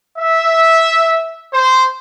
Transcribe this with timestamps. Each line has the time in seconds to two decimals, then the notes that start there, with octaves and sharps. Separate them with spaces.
0.17 E5
1.51 C5